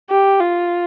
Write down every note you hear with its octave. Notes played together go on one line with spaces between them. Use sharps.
G4
F4